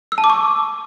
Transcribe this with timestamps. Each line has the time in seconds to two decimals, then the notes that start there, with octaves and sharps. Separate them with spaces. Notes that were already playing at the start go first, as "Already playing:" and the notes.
0.12 E6
0.18 A5
0.24 D6
0.30 C#6